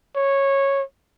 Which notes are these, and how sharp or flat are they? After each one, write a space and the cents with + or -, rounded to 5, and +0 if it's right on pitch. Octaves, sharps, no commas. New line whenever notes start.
C#5 -10